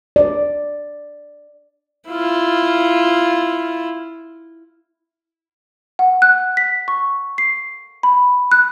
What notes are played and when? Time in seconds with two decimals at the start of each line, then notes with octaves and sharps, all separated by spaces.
0.16 D5
2.09 E4 F4
5.99 F#5
6.22 F#6
6.57 B6
6.88 C#6
7.38 C7
8.03 B5
8.52 F#6